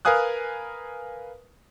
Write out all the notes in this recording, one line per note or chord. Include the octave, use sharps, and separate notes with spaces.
A#4 B4 F5 G#5 D#6 F#6